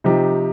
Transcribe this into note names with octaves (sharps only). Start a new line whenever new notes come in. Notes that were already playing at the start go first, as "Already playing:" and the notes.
C3 F3 D#4 G4